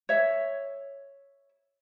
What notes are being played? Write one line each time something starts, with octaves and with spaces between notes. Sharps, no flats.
C#5 E5